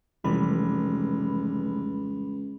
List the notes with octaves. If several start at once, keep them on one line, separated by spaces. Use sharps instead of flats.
F1 C#2 E3 G3 B5